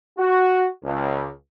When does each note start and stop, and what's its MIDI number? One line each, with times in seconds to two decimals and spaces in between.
0.18 0.66 66
0.83 1.28 37